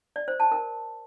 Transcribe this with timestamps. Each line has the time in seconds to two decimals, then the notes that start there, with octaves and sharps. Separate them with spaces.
0.16 D5
0.28 C5
0.40 A5
0.52 A#4